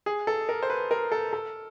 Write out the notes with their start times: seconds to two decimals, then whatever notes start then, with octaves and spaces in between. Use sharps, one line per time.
0.06 G#4
0.27 A4
0.49 A#4
0.63 C5
0.70 B4
0.91 A#4
1.12 A4
1.33 A4